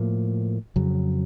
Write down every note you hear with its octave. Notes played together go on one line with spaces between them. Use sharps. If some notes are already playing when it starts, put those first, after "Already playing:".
Already playing: A2 F3 A#3
F2 C#3 F#3